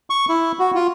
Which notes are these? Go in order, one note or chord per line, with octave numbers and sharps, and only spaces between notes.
C#6
E4
F#4
F4